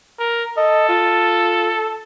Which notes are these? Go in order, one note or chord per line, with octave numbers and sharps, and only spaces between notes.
A#4
A4 D#5
F4